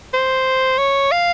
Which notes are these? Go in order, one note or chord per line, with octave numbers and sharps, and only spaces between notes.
C5
C#5
F5